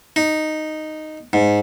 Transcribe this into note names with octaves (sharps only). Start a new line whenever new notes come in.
D#4
G#2